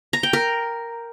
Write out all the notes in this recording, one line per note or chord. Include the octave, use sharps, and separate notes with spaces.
A#5
G5
A#4